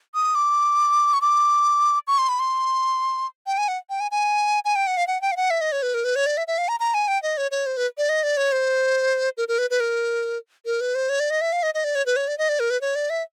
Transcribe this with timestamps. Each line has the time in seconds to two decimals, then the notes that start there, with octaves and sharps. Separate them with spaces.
0.14 D#6
0.35 D6
1.13 C#6
1.22 D6
2.07 C#6
2.18 C6
2.29 B5
2.39 C6
3.47 G5
3.58 G#5
3.68 F#5
3.90 G5
4.00 G#5
4.11 G#5
4.65 G#5
4.76 G5
4.87 F#5
4.97 F5
5.07 F#5
5.22 G5
5.32 F5
5.37 F#5
5.50 E5
5.61 D#5
5.72 C#5
5.82 B4
5.94 A#4
6.04 B4
6.16 C#5
6.26 D5
6.37 E5
6.47 E5
6.58 F5
6.68 A#5
6.80 A#5
6.94 G#5
7.08 G5
7.23 D#5
7.37 C#5
7.51 C#5
7.66 C5
7.77 B4
7.98 D5
8.09 D#5
8.23 D5
8.37 C#5
8.52 C5
9.37 A#4
9.48 A#4
9.58 B4
9.70 B4
9.80 A#4
10.66 A#4
10.81 B4
10.95 C5
11.09 C#5
11.20 D5
11.30 D#5
11.41 E5
11.53 F5
11.63 D#5
11.74 D#5
11.84 D5
11.95 C#5
12.06 B4
12.16 C#5
12.28 D5
12.38 D#5
12.49 D5
12.60 A#4
12.70 B4
12.81 C#5
12.95 D5
13.10 E5